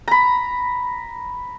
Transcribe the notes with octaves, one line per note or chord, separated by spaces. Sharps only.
A#5 B5